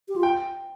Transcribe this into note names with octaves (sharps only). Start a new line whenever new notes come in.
G4
F4
G5